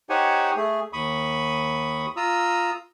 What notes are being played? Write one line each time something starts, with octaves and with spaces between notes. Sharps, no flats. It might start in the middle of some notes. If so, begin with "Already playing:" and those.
D#4 G4 C5 C#5 F#5 G#5
A3 G#4
D#2 B5 C#6 D#6
F4 A#5 D#6 E6